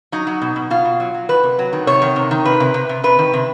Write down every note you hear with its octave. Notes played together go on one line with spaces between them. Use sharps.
F#3 D#4
F#3
B2
B2
B2 F4
B2
F#3
F#3
D#3 B4
C3
F#3
D#3
C3 C#5
D#3
C3
D#3
C3 B4
C3
C3
C3
C3 B4
D#3
C3